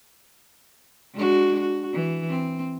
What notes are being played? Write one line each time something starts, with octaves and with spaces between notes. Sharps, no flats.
G#3 D4 F#4
F#4
E3
C4